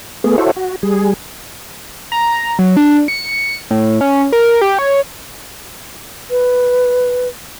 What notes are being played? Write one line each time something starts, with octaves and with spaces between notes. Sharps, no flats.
A3 B3 G#4
E4 F#4 A4 C5 C#5
F#4
G3 G#4
A#5
F#3
D4
C#7
A2
C#4
A#4
G4
C#5
B4